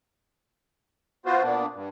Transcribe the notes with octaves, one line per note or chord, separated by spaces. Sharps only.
B3 F4 F#4 C5
A#2 A#3 B3 D4
G2